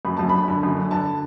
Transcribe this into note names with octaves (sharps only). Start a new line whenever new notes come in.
F#2 B5
F#2 A5
D3 B5
D3
F#2
D3
D3 A5